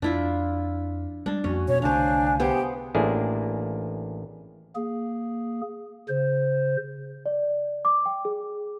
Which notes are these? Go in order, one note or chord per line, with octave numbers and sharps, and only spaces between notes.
F2 D4 E4 F4
G3 G#3 D4
F2 A#3 C#4 F#4
B2 B3 C#5
C2 D3 A3 D4 C5 F5 G#5
B3 G4 G#4 C5
A1 A#3 D4 E4 G#4
A#3 G#4
C#3 C5
D5
D6
G5
G#4